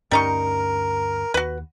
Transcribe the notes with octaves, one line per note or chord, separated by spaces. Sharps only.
D2 G2 G3 C#4 D#4 A#4 C#6
D#2 F#4 B4